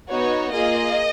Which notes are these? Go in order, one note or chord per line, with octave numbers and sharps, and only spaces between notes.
B3 D#4 F#4 C#5
A#3 F4 G#4 D#5